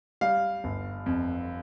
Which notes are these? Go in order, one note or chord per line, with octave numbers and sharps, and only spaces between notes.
G3 F5
G1
F2